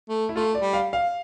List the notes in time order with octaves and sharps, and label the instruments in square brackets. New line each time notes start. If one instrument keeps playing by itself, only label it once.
[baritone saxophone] A3
[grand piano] E4
[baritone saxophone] A3 [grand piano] F4
[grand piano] D5
[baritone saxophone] G3
[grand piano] F5
F5